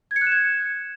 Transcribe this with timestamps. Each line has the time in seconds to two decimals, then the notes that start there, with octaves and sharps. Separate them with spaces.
0.11 G#6
0.16 C#7
0.21 F#6
0.27 E7
0.32 G#6